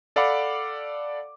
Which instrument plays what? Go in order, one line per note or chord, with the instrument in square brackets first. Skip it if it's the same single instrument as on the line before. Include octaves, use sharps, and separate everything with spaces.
[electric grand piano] A4 D5 F5 F#5 B5 D6